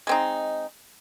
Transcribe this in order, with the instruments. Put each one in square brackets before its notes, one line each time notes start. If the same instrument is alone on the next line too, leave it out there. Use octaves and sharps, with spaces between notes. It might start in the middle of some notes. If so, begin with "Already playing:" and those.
[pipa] G#3 C4 D#4